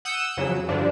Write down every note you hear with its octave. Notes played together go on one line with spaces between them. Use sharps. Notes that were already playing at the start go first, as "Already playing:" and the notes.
F#5 D#6 E6 G6
F2 C#3 F#3
G2 D3 F3 D4